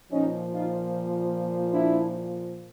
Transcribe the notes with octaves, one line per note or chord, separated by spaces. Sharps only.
A#2 F3 C#4 D#4
D#4 F4
D4 E4